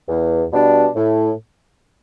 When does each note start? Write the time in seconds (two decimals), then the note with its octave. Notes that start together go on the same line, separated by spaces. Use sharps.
0.09 E2
0.52 B2 G3 D4
0.96 A2